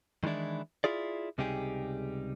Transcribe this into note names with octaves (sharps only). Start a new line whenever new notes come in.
D#3 E3 G#3 D4 E4
E4 F4 G#4 D5
C#2 C3 G3 D#4 G4 G#4